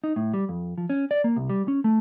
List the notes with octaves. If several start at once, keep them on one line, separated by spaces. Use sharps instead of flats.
D#4
A2
G3
F2
F3
C#4
D5
A#3
C2
G3
C#4
A3